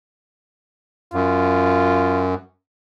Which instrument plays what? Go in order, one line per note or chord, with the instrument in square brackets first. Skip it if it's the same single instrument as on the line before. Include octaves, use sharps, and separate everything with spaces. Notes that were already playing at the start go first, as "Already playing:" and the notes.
[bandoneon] F#2 [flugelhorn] F4